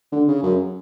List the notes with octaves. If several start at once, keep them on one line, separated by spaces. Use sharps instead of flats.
D3
C#3
F#2